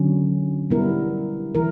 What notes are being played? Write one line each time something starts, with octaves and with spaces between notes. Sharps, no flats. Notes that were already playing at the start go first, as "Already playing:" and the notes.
Already playing: D3 F#3 C#4
G3 B3 E4 A#4
E3 E4 A#4